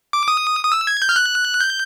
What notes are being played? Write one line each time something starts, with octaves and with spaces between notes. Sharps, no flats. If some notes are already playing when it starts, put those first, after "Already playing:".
D6
D#6
D#6
E6
G#6
G6
F6
F#6
G6